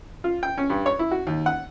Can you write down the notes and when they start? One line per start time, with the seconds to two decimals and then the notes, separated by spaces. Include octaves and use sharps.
0.24 F4
0.43 G5
0.58 C#4
0.70 G2
0.86 C#5
0.99 E4
1.11 F#4
1.27 D#2
1.46 F#5